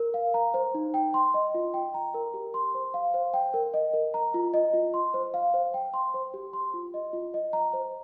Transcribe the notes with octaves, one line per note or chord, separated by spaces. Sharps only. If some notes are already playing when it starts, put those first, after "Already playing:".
Already playing: A#4
F5
A#5
C5
D#4
G5
C6
D#5
F4
G5
A#5
A#4
G4
C6
C5
F5
C5
G5
A#4
D#5
A#4
A#5
F4
D#5
F4
C6
C5
F5
C5
G5
C6
C5
G4
C6
F4
D#5
F4
D#5
A#5
C5